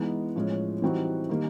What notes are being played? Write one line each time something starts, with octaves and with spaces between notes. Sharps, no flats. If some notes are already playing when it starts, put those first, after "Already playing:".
Already playing: E3 G#3 B3 D#4
A2 F3 G#3 C#4
E3 G3 C4 D#4 F#4
D#3 G3 A#3